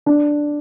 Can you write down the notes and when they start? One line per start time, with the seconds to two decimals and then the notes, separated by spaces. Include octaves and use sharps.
0.06 D4